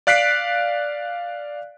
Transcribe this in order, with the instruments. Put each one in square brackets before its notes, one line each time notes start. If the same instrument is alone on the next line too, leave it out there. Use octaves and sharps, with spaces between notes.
[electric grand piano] D5 F5 F#6 B6 C7 D7